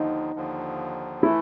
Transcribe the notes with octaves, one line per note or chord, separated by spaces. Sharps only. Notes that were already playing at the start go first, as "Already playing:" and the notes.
Already playing: D#2 D3 F3 D#4
D#2 D3 F3
E3 A3 E4